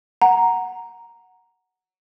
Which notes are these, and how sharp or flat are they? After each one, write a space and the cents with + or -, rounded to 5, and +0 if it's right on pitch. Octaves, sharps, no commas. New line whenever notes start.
F#5 +0 A#5 +0